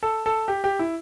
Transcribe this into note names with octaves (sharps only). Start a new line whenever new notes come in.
A4
A4
G4
G4
E4